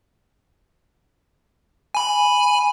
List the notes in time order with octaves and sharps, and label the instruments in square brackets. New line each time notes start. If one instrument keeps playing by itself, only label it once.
[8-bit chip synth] G#5 B5